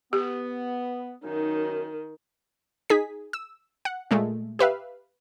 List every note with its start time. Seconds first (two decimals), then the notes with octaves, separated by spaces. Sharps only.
0.13 B3 G4
1.24 F#2 D#3 D#4
2.90 D#4 G#4 B6
3.33 E6
3.85 F#5
4.11 A#2 G#3 A3
4.59 G4 B4 E5 F5